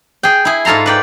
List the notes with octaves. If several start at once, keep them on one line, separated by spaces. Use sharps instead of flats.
G#4 G5
E4 G#4
G#2 F4 A4 A#5 C6
B4 D5 G5